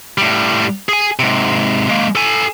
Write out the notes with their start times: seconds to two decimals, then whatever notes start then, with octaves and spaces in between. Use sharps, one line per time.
0.18 A2 G3
0.89 G#4 G#5
1.19 G#2 C3
1.89 G#3 A#3
2.15 A4 G#5